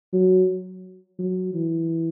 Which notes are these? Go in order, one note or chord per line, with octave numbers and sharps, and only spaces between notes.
F#3
F#3
E3